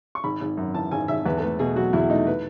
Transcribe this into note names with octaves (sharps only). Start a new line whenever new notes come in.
C#6
G#1 B5
G#1
F#2
E3 A5
G#1 G#5
G#1 E5
E2 B4
A4
A3 B4
B2 G#4
F#3 F#4
E2 E4
A3 D#4
B4